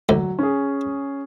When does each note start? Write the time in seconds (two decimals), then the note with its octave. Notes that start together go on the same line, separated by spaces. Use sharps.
0.09 D2 F#3
0.39 C#4 G#4